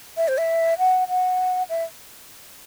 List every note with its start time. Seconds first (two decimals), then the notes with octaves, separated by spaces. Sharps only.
0.17 E5
0.28 C5
0.38 E5
0.79 F#5
1.08 F#5
1.69 E5